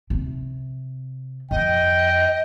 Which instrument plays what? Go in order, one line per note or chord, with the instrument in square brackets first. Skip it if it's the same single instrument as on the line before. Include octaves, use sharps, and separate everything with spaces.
[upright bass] C3
[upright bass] F2 [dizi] D#5 [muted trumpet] G5